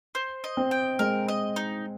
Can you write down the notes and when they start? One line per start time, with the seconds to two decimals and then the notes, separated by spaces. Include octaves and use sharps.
0.15 C5
0.44 D#5
0.57 C4
0.71 G5
0.99 G#3 A#4
1.29 D#5
1.56 D#4